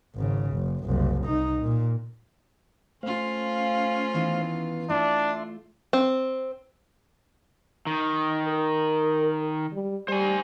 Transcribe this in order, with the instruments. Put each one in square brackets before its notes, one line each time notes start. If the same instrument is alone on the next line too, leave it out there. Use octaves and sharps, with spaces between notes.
[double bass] G#1 C#3
F#1
F#1 C2
C2 D#4
A#2
[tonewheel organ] A3 C5 F5 [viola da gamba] C#4 F4
[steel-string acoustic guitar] D#3 E3 B3
[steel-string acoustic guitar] A3 F4 [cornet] D4 [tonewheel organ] E5 C6
[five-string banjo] C4
[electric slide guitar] D#3
[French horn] A#4
G3
[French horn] G3 [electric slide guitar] C5 G#5